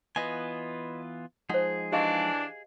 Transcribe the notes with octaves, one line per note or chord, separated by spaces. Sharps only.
E3 B3 F4 B4 D#5 G#5
F3 G#3 D#4 G#4 C5 F#5
E3 D4 G4 D#5 F5